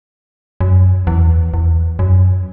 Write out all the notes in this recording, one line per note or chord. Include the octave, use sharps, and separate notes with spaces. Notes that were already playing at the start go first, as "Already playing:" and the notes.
F#2
E2
E2
F#2